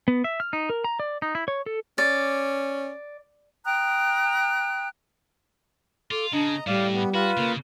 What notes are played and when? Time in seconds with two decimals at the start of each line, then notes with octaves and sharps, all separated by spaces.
0.08 B3
0.24 E5
0.40 F6
0.53 D#4
0.70 A#4
0.84 A#5
1.00 D5
1.22 D#4
1.35 E4
1.48 C#5
1.66 A4
1.98 C#4 D5
3.65 G5 A#5 D#6 F#6
6.11 F4 A4 D6
6.33 C#3 D4 D#5 A#5
6.67 A2 G3 D5 F5
6.94 B3
7.14 F4 F#4 B4
7.37 C#3 A#3